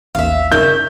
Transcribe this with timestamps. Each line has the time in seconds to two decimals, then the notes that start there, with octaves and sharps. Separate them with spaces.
0.15 A1 D#2 E5 F5
0.52 C#3 D#4 A#4 C#5 D5 E5 G6